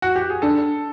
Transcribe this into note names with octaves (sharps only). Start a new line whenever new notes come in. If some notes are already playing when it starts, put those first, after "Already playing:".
F#4
G4
G#4
D4 A4